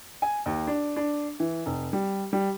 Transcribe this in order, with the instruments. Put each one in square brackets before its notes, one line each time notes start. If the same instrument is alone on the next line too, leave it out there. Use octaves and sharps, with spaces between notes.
[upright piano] G#5
D#2
D4
D4
E3
F1
G3
G3